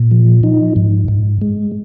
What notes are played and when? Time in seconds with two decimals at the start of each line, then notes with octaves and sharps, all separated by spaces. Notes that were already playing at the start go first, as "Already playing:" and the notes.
Already playing: A#2
0.11 F3
0.43 D#4
0.76 G#2
1.08 G#2
1.41 G#3